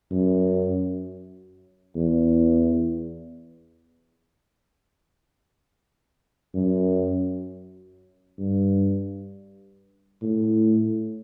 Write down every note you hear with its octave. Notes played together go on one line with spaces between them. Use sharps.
F#2
E2
F#2
G2
A2